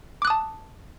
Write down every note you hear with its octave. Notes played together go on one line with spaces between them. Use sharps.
A5 D6 D#6 F#6